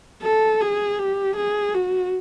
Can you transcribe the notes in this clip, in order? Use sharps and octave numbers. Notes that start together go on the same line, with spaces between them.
A4
G#4
G4
G#4
F#4